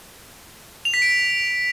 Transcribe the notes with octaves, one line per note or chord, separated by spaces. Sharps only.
F7
B6
D7